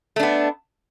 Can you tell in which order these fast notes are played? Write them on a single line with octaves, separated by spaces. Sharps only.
A3 D4 B3